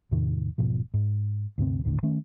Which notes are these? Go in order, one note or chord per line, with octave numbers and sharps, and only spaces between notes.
E2 A2 C3 D#3
E1 G#2 B2 F3
G#2
D2 G2 C3 C4
G#1 D#2 A2 D3
D#3 A3 C#4